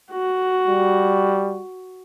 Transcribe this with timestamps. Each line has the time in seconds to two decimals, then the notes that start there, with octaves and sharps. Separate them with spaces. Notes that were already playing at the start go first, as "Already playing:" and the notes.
0.12 F#4
0.67 G3